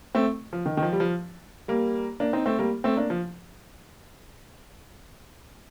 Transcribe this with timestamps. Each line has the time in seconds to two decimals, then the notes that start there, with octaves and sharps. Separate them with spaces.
0.15 A3 C4
0.53 F3
0.65 D#3
0.77 D#3
0.83 F3
0.93 G3
1.00 F3
1.68 G3 A#3
2.20 A#3 D4
2.33 C4 D#4
2.46 A3 C4
2.59 G3 A#3
2.84 A3 C4
2.97 A#3 D4
3.10 F3